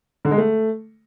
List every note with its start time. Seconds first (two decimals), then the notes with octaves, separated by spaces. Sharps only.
0.25 D3
0.31 G#3
0.38 A3